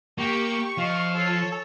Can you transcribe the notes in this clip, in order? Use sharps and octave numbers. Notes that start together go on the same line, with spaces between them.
A#3 G4 C#6
F3 D#5 F5
A4 C#5